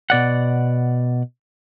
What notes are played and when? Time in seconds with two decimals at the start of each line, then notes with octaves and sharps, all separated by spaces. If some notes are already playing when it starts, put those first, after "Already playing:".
0.10 B2 D5 F#5